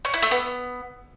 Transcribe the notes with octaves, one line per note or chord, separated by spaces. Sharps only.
C#4
E4
A3
B3